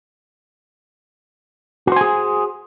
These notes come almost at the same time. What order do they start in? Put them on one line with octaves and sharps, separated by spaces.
F#4 C5 G#5 G#4